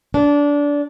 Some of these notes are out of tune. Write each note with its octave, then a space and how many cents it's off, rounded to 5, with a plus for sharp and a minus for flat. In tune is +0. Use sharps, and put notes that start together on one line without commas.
D4 -20